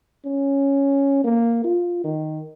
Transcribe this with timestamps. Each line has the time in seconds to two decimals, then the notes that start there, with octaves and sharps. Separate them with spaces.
0.25 C#4
1.24 A#3
1.64 F4
2.04 D#3